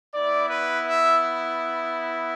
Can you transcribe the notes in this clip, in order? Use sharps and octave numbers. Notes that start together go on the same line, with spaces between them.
B3 E4 D5
B4
E5